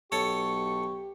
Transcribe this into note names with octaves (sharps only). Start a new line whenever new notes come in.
B1 G4 A4 C#5 A5 C#6